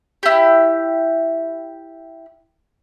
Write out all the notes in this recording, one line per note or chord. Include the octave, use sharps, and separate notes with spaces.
E4 G4